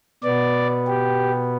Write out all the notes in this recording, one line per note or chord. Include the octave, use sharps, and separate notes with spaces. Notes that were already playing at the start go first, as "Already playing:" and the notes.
B2 B3 D5
G4